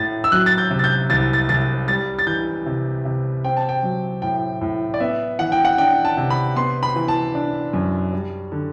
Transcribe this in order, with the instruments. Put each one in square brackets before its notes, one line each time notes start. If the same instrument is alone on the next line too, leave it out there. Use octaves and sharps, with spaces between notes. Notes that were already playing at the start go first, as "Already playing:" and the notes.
Already playing: [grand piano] A2 A6
E6
F#3 F#6
A6
G6
C3
A6
G6
C2 A6
A6
C2 A6
G3 A6
A6
E3 G6
C3
C3
C4 G5
A5
G5
F#3
A2 G5
A2
D5
B3 E5
E3 F#5
G5
F#5
D4 G5
A5
C3
B5
B3 C6
B5
E3
A5
D4
F#2
G3
D3